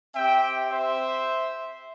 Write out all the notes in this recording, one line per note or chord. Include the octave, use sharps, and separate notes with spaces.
C4 G4 E5 G5
C5 E5